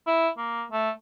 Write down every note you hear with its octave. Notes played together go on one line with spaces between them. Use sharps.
E4
A#3
A3